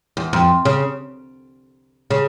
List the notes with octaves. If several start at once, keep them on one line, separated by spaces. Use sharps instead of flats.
E2
F2
C#3
C#3